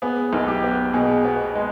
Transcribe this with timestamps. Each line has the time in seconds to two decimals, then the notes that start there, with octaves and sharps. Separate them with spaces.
0.02 B3 G#4
0.33 B1
0.48 G4
0.63 B3
0.93 B2 G#4
1.25 B3
1.55 G#3